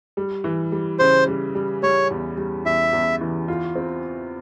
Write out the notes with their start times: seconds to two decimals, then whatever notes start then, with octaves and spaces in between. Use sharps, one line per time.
0.17 G3
0.44 E3
0.72 G3
0.99 C#3 C5
1.27 G3
1.55 G3
1.83 G3 C#5
2.10 E2
2.37 G3
2.65 E2 E5
2.93 E2
3.21 E3
3.48 F4
3.76 C4